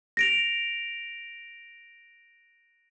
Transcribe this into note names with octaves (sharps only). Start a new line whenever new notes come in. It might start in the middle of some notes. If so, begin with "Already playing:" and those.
A#6 D7 F7